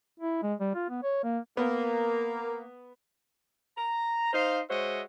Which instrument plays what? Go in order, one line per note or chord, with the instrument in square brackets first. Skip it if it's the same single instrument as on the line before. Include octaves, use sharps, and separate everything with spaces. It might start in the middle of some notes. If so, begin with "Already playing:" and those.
[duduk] E4
G#3
G3
F4
B3
C#5
A#3
[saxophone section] A#3 [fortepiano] B3
[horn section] A#5
D#4 C5 F5
G#3 F#4 C5 C#5 D#5 E5